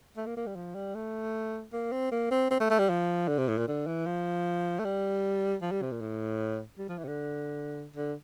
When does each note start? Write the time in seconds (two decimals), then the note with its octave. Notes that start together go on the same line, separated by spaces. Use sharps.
0.17 A3
0.26 A#3
0.37 A#3
0.46 G3
0.55 F3
0.75 G3
0.95 A3
1.73 A#3
1.92 C4
2.12 A#3
2.31 C4
2.51 C4
2.60 A3
2.70 A3
2.79 G3
2.90 F3
3.28 D3
3.38 C3
3.48 A2
3.58 A#2
3.68 D3
3.87 E3
4.06 F3
4.79 A3
4.85 G3
5.62 F3
5.72 G3
5.82 C3
5.92 A#2
6.01 A2
6.78 G3
6.89 F3
6.98 E3
7.04 C3
7.08 D3
7.96 D3